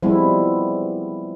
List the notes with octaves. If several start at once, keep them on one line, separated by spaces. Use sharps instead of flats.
F3 G3 G#3 B3 C4 E4